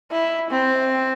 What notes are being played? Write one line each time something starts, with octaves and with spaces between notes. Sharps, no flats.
E4
C4